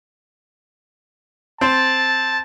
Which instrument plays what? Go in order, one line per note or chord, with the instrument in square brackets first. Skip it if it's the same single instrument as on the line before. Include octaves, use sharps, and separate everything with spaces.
[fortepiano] C4 C5 [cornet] A5